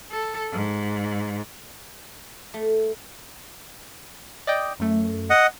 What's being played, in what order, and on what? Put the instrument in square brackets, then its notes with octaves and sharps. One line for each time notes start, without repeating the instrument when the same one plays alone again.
[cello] A4
G#2
[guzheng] A3
[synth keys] D5 D#5 G5
F#2 A3
[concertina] D#5 F#5